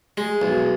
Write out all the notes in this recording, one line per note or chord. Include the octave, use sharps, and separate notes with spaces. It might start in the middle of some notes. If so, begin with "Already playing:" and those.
G#3
B1